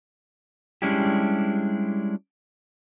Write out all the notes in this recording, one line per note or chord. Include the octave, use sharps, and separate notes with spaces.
G3 G#3 C#4 D4 E4 G4